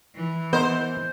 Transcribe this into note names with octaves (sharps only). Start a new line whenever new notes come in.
E3
B3 A#4 C5 D#5